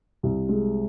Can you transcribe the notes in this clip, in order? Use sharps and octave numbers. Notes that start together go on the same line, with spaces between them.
C2
G#3